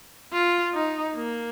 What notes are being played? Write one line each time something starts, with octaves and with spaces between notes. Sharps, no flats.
F4
D#4
A#3